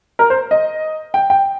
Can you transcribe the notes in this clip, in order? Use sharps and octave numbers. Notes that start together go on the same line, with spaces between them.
A#4
C5
D#5
G5
G5